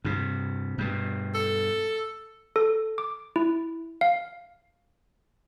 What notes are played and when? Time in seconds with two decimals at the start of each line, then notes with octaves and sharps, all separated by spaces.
0.04 G2 C3
0.78 G2 B2
1.35 A4
2.56 A4
2.98 D6
3.36 E4
4.01 F5